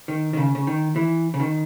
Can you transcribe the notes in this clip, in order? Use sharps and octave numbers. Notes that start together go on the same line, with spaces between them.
D#3
D#3
C#3
C#3
D#3
E3
C#3
D#3